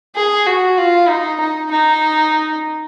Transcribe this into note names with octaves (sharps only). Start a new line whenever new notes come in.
G#4
F#4
F4
D#4
D#4
D#4